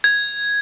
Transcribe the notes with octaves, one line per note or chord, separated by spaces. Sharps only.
G#6